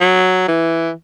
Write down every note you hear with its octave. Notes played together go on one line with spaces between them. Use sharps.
F#3
E3